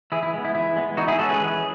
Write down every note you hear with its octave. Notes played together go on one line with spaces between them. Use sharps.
E3 E4 G#4
E4
G#3 B3
E4
E3 E4
G#3 B3
E3 D#4 F#4
E4 G#4
G#3 C#4 F#4 A4
G#4 B4
E3